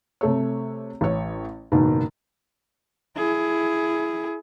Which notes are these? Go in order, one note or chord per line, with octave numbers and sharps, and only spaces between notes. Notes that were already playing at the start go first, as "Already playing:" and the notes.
C3 A3 C#5
A1 C#5
F#1 G#2 B2 D#3
E4 G#4